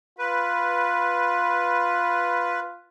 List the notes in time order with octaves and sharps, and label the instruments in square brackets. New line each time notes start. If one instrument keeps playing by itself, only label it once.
[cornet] F4 [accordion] B4